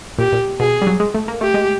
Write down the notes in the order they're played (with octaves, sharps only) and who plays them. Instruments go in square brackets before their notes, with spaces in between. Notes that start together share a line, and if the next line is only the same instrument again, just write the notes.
[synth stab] A#2 [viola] G4
[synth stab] A#2
[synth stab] B2 [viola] G#4
[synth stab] G3
F#3
G#3
A3
A#3
[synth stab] A3 [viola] G4
[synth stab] G#3